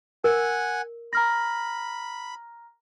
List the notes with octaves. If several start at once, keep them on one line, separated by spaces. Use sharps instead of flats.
A#4 F#5 G#5
A#5 B5 F6 A#6